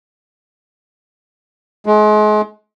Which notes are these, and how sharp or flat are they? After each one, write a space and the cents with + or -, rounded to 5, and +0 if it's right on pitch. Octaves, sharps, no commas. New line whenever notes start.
G#3 +35